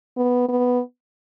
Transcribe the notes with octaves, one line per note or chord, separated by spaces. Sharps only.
B3
B3